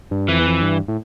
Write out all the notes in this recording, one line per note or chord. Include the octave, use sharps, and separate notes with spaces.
G2
F2 E3
E2
F2
G2
A2